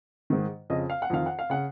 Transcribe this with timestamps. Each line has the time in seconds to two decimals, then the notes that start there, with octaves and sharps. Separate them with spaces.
0.30 G#2 D#3
0.70 F2 C#3 D#5
0.90 F5
1.02 F#5
1.10 F2 D#3 F5
1.26 F#5
1.39 F5
1.50 C#3 F#5